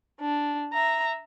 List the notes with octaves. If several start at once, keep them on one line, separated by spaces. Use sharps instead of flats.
D4
E5 A#5